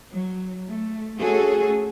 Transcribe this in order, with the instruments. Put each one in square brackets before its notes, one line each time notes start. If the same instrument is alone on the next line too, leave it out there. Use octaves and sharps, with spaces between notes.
[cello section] F#3
A3
A3 C#4 F#4 G#4 A4